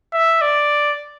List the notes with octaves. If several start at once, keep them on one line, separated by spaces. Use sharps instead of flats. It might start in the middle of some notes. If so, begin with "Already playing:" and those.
E5
D5